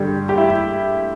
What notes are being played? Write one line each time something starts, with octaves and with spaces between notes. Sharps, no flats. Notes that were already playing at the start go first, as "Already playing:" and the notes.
Already playing: G2 D3 G3 G4
G4
E4